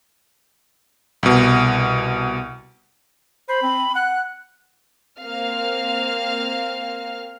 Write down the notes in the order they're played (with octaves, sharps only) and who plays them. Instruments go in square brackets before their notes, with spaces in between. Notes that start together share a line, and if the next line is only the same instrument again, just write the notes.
[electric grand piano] C2 B2
[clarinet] C5 [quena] B5
[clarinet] C4
[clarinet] F#5 [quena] F#6
[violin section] A#3 C4 F5 F6